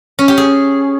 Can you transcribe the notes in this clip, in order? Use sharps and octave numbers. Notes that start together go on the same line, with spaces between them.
C#4
G4
G#4